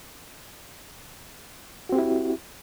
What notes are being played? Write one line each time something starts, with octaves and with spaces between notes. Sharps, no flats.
C4 E4 F#4 G4